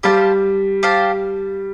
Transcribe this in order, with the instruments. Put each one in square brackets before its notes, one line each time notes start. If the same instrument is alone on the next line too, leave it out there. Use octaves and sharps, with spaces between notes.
[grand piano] G3 [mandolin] G4 C5 F5 A5
[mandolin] G4 C5 F5 A5